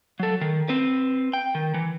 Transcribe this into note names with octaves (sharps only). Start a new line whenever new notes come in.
F#3 A4
D#3
C4 B4
G5
D#3
E3